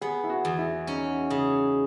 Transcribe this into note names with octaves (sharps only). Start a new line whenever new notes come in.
B3 G#4
E4
F#4
E2
E4
C#4 D#4
C#3